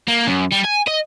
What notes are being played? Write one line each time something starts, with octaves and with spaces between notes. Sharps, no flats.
A#3
F#2
G3
G#5
D#5